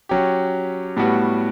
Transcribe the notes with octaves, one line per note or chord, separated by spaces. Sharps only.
F#3 C#4 G4
A2 G3 B3 F#4